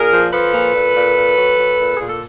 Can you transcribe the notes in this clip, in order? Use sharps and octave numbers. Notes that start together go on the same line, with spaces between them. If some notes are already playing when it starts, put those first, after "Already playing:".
Already playing: A#2 G#4 A#4
F3
F3 A4 B4
A#2
A#2
A#2
A#2
F#3
F#3
A#2
A#2 G#4
A4